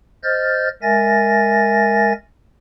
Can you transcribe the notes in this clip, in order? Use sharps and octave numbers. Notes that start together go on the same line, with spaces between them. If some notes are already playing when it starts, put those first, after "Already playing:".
C5 D#5 F6 G6 A6
G#3 A#4 E5 G#5 A6 A#6